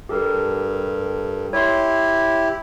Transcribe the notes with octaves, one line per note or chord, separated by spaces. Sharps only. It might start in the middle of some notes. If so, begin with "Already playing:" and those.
G2 G4 A4 A#4
E4 G4 C#5 C6